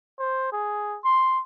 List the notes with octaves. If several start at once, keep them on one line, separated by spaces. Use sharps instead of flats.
C5
G#4
C6